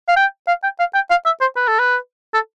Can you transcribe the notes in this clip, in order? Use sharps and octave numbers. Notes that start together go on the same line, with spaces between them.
F5
G5
F5
G5
F5
G5
F5
E5
C5
B4
A4
B4
A4